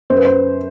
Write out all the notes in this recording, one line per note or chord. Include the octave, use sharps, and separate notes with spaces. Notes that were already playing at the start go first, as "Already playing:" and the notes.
F#2 C5
B4
C5